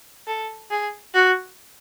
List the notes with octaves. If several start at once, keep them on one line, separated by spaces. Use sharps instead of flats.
A4
G#4
F#4